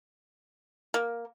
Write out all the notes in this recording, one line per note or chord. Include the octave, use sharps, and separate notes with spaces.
A#3